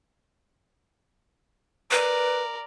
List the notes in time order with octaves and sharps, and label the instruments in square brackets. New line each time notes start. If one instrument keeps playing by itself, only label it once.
[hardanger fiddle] A#4 D5 [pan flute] B4